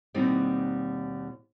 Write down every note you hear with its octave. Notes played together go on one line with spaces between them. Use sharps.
D#2 B2 G3 C4 D#4